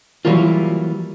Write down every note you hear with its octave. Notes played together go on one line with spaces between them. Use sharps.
E3 F#3 G3 A#3 F4